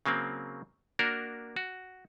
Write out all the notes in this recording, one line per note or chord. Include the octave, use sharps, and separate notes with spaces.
C#3 F#3 A#3 C4
A#3 D4 F#4 A#4
F#4